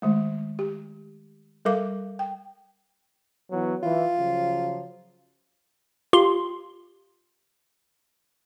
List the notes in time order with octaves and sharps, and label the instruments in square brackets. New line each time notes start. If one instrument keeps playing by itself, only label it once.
[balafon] D#3 G#3 A3
G4
G3 A4 A#4 F5 D6
G5
[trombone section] E3 F#3 B3
[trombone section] E3 E4 [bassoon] F4
[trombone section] C#3 F3 F#3
[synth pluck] F4 G4 C6